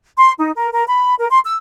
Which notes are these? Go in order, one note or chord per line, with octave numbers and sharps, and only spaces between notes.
C6
D#4
A#4
A#4
B5
A#4
C6
E6